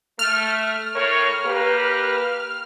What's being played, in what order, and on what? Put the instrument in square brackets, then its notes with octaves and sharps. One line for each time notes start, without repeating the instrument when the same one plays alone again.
[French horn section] A3 [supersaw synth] F6
[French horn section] A2 A#4 C#5
A#3 G4 B4